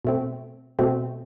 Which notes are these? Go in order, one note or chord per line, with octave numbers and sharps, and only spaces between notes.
B2 A3 C4
B2 A3 C4